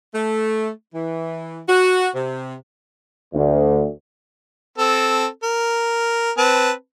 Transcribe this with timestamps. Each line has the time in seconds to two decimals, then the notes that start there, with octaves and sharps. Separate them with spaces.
0.15 A3
0.95 E3
1.69 F#4
2.15 C3
3.34 D2
4.78 C4 A4
5.43 A#4
6.38 C4 B4 A5